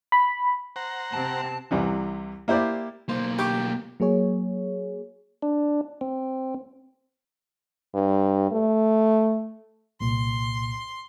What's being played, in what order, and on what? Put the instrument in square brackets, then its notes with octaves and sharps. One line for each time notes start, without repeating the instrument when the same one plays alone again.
[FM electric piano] B5
[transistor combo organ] C5 F#5 A#5
[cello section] C3 C4 [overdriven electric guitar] A5
[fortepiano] C2 C3 E3
A#3 E4 G4 C5 D5
[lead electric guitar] B1 A#3 [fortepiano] C5
[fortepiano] G4 C#6 D6
[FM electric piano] F#3 A#3 G#4 C#5
[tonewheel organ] D4
C4
[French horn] G2
A3
[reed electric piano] C2 A#2 [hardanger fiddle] C6